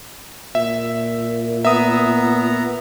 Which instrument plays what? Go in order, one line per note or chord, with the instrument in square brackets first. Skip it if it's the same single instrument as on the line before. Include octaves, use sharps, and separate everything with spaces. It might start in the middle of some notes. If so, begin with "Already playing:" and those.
[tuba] A#2 [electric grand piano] E5
[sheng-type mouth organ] B3 A#5 [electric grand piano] E5 D#6